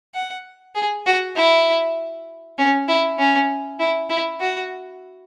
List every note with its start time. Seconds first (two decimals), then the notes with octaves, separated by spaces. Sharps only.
0.14 F#5
0.75 G#4
1.06 F#4
1.36 E4
2.58 C#4
2.88 E4
3.19 C#4
3.79 E4
4.10 E4
4.40 F#4